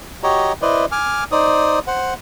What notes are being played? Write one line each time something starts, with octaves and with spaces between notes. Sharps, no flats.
F#4 G4 C#5 D#5 A#5
E4 B4 C5 D5 D#5
G#5 D6 F6
D#4 C5 D5 D#6
C5 F#5